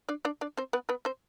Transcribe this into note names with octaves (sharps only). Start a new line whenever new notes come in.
D4 D5
D4 D5
D4 D5
C4 C5
B3 B4
B3 B4
C4 C5